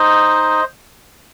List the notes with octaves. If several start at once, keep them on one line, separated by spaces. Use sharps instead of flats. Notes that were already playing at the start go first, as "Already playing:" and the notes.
Already playing: D#4 C5 D#5